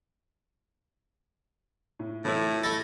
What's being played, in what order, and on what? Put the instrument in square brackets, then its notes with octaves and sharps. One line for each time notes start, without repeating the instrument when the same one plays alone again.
[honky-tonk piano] A2
[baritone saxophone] A2 [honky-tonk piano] E3 E4
[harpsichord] A3 E4 A4 [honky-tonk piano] A6 A#6